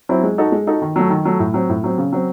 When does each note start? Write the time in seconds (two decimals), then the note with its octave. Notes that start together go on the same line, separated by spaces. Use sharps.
0.09 F#3 C4 E4
0.23 G#3
0.38 D#4 F#4 A4
0.52 G#3
0.67 D#4 F#4 A4
0.82 D#3
0.96 F#3 A3
1.10 D#3
1.25 F#3 A3
1.39 A2
1.54 F#3 C4
1.69 A2
1.84 F#3 C4
1.98 C#3
2.13 F#3 C4